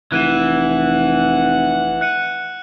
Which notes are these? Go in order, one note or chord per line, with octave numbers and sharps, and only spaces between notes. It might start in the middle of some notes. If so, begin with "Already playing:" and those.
F1 E3 F#5 F#6 D#7 E7
F#6 C#7 D#7